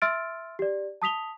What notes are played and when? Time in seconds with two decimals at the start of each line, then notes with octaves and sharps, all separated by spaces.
0.02 E5 C6 E6 F6 A6 D7
0.59 G4 D5
1.02 A5 D#6 B6 F7 G7